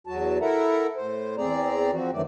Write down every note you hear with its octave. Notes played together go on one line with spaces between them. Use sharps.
E2 F#3 F#4 A5
E4 A4 A#4 E5 F#5 A#5
A2 C5
E2 C4 G#4 D5 A#5
F3 C4 F#4
F#2 D#3 E3 F#3 A3 D5